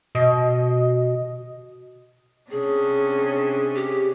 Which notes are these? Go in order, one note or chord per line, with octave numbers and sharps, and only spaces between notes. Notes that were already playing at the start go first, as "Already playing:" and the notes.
B2 D#5
C3 C#4 D4 G#4
G4